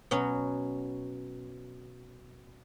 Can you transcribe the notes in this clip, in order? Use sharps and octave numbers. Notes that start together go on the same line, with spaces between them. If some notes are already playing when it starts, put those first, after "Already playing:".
B2 F#3 C#4